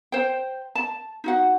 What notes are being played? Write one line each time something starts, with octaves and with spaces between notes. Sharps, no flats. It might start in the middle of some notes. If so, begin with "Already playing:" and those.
C5 G5
A5
D#4 F#4 F#5